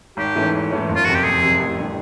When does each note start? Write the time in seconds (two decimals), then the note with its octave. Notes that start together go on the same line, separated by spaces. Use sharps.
0.17 G#1 G4
0.36 G#2 E3 A3 C#4
0.53 G#1
0.71 G#2 E3 A3 C#4
0.89 F#1
0.96 F4
1.05 F2 C3 F#4
1.15 G4
1.24 F#1 G#4
1.42 F2 C3
1.59 A1
1.77 D3 G3